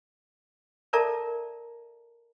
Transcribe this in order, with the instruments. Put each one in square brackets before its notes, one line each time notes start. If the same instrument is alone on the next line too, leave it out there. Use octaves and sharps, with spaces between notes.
[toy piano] A4 A#4 D5 E5 A5 A#5